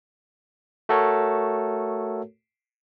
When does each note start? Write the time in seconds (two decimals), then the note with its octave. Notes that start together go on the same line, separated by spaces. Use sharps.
0.89 A3 F#4 A4 A#4 C#5